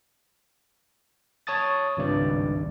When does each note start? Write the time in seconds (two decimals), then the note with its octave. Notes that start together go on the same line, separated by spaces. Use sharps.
1.47 C#5 A5 D#6 A6
1.97 G#1 C#2 G2 D5